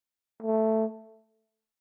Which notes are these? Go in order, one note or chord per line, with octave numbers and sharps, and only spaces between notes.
A3